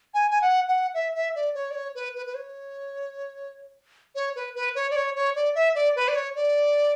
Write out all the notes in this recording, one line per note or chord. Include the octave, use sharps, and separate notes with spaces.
G#5
G#5
F#5
F#5
E5
E5
D5
C#5
D5
C#5
B4
B4
B4
C#5
C#5
B4
B4
C#5
D5
C#5
C#5
D5
E5
D5
B4
D5
C#5
D5